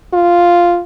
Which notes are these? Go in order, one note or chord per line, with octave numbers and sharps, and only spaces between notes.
F4